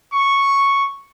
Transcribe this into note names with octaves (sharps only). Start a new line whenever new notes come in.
C#6